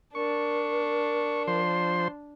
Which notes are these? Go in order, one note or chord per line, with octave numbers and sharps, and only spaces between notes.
D4 A#4 C#6
F3 C5 C6